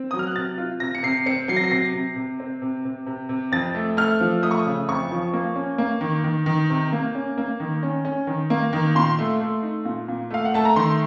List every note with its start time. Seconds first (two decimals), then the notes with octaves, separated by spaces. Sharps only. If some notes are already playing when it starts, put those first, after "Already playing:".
Already playing: C4
0.11 F#3 D#6
0.19 F6
0.27 F#6
0.36 C3 A6
0.58 F4
0.80 C3 A#6
0.95 C#7
1.03 C3 C7
1.26 C4 C#7
1.48 F#3 C7
1.57 A#6
1.64 C7
1.71 C3 A#6
1.93 C3
2.16 C3
2.40 C4
2.62 C3
2.85 C3
3.06 C3
3.29 C3
3.52 F2 A6
3.75 A3
3.97 A3 F6
4.20 F3
4.42 A3 D#6
4.51 C#6
4.59 D#6
4.66 C#3
4.89 F2 C#6
5.11 F3
5.33 A#3
5.55 C#4
5.78 A#3
6.01 D#3
6.24 D#3
6.46 D#3
6.70 C3
6.92 A#3
7.15 C#4
7.38 A#3
7.60 D#3
7.83 C#4
8.05 C#4
8.27 D#3
8.50 A#3
8.73 D#3
8.95 A#2 C6
9.19 A3
9.40 A3
9.63 D#4
9.85 A#2
10.08 A#2
10.30 A3 F5
10.45 F#5
10.54 A3 A5
10.65 A#5
10.76 D#3 C6